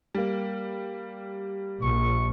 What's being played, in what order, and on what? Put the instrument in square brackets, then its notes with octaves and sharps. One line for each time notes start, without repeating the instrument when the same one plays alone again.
[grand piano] G3 A#3
[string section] A#1 [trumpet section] C#6